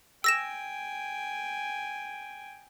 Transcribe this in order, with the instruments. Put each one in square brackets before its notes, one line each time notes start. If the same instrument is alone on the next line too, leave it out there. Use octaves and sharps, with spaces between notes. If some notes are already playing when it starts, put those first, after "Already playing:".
[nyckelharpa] G5 G#5 [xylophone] E6 A#6 E7